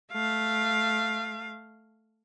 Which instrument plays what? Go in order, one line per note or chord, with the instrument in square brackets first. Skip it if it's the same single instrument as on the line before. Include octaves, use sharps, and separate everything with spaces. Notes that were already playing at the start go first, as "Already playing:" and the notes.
[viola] A3 F5